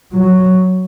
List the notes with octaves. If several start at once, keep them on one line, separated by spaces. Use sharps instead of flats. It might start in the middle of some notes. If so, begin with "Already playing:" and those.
F#3